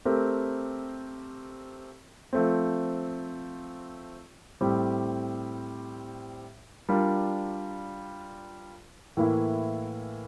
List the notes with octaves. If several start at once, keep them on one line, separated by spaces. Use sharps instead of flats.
A3 C4 G4 A#4
F3 A3 C4
A2 G3 C4 G4
G3 D4 F4 A#4
A2 E3 A#3 E4